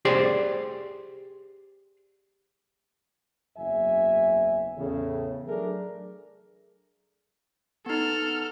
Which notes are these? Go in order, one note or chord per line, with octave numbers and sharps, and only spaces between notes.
G4 G#4 C5 D5 C6
F#1 E2 F#3 E5 G#5
E2 A2 C#3
F#3 A3 D4 G#4 A#4
B3 D#4 A4 F6